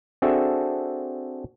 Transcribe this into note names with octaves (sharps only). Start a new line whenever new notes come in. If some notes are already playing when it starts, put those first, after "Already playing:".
C4 D4 F#4 G#4 A4 E5